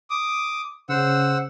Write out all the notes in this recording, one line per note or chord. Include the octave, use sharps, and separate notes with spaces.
D6 D#6
C#3 C5 F#5 E6